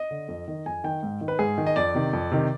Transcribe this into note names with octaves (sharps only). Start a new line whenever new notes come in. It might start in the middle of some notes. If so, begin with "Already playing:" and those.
Already playing: D#5
D3
F2
D#3
F2 G#5
D#3 G5
G#2
D#3
B4
G#2 G#4
D#3
D#5
F2 D5
C3 D#3
F2
C3 D#3